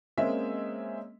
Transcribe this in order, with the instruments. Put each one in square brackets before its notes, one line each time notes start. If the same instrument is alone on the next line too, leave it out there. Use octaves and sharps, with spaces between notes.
[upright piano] G#3 A#3 C4 C#4 D#5 E5